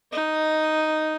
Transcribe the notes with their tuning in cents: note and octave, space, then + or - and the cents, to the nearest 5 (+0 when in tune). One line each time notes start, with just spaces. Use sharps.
D#4 +0 D#5 +0